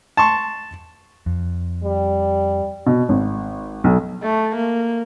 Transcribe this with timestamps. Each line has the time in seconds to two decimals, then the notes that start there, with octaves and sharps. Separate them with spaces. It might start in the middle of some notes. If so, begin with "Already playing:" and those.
0.17 A5 C6 C#6
1.26 F2
1.84 G3
2.86 B2
3.09 G#1
3.84 B1
4.23 A3
4.56 A#3